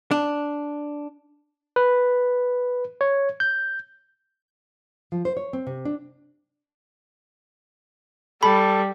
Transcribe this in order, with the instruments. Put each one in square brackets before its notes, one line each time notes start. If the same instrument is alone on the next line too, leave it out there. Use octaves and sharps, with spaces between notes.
[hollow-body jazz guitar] D4
[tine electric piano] B4
C#5
G6
[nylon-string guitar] F3
C5
C#5
C4
C3
D4
[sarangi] G3 [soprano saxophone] A4 [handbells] B5